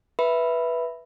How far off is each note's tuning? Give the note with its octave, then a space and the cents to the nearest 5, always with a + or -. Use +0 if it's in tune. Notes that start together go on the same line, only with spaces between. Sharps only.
B4 -10 E5 +0 B5 +0